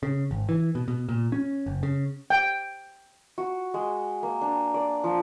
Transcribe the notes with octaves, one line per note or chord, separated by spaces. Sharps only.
C#3
G#1
E3
B2
B2
A#2
C#4
F#1
C#3
G5
F#4
G#3
A#3
D4
D5
F3